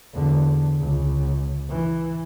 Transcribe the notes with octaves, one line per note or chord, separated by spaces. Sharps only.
E2 D3
C#2
E3